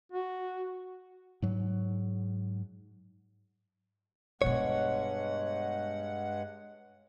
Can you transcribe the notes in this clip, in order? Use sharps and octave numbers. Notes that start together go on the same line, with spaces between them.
F#4
G#2 F#3
G2 B2 G#3 B3 C#5 F#5